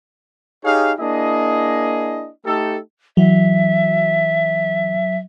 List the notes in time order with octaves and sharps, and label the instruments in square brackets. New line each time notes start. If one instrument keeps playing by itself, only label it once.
[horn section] D#4 G4 G#4 C#5 F5
A#3 D4 E4 G#4 D#5
A3 D#4 G4 A4
[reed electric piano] E3 [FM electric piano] F#3 [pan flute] E5